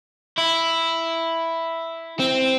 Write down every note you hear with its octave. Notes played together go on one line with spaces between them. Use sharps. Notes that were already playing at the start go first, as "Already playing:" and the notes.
E4
C4